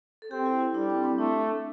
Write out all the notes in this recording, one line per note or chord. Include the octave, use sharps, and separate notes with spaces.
A4
C4 G4
E4
E4
G3 D4
C4
C4
A3 D4